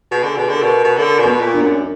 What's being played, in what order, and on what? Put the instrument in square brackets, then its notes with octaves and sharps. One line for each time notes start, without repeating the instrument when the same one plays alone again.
[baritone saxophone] B2 [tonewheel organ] G#4
[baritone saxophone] D3
B2
D3
[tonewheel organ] A#4
[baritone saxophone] B2
B2
[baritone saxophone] D3 [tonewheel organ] A#4
[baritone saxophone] B2
[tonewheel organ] B3
[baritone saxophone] A#2
[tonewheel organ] D4
[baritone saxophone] F#2